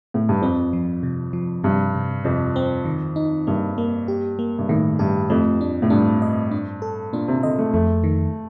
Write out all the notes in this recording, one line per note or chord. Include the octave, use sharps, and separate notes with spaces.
A2
G2
F2 C4
F3
C3
F3
G2 C3
C3
F2 C3
C4
D#3
D#4
G2 A#3
A#3
G4
A#3
G2
A2 D#3
G2 G4
F2 A3
D4
A2
G2 D4
D#5
D4
A4
A#2 D4
C3
D3 D#5
A3
F2 A3
D#3